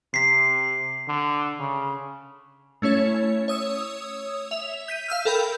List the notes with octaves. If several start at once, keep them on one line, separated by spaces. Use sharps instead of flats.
C3 B6 C7
D3
C#3
A3 C#4 E4 C#5
C#5 D#6 E6
E5 F7
G6 B6 D#7
F5 E6 F6
A4 A#4 G5 B5 G6